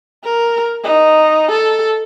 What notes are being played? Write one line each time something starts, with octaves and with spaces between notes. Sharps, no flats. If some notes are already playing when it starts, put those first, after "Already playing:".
A#4
D#4
A4